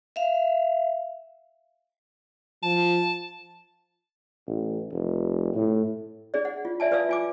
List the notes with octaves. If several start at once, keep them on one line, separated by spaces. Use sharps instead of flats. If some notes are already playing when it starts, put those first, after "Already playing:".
E5 F5
F3 A5
A1
F1
A2
D4 G#4 D5
F#5
F4
D5 E5 G#5 A5
F4 B4 D5 F5 D#6 E6
F4 G#5 D6